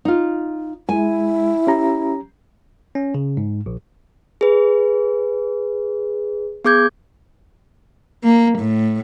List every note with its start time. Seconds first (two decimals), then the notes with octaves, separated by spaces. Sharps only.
0.05 D#4 F4
0.89 G#3 E4 G#5
1.67 C#4 G4 A#5
2.95 C#4
3.14 C#3
3.37 G#2
3.66 A#1
4.41 G#4 B4
6.64 B3 G#4 D6 G6 G#6
8.23 A#3
8.59 A2